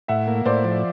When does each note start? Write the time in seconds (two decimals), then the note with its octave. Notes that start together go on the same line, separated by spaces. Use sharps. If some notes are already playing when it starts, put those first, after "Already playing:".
0.08 A2 E5 F#5
0.27 A#3
0.46 A2 C5 D5
0.64 F3